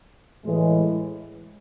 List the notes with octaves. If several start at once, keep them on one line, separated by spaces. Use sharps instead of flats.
A2 E3 G#3